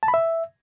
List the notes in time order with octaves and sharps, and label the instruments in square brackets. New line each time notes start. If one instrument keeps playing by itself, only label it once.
[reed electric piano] A5
B5
E5